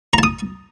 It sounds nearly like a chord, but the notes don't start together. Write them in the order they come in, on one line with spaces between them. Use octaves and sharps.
A#5 A5 D#6